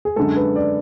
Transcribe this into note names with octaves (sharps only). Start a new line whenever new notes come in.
G#4
F#2 D3 G#3 A4
B4
D5